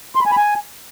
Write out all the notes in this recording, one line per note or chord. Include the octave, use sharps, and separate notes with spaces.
C6
B5
G#5
B5
G#5